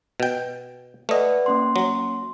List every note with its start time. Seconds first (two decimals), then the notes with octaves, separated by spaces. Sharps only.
0.20 B2 G5
1.09 A3 B4 D5 D#5 F#5
1.46 A#3 C#4 C6
1.76 F#3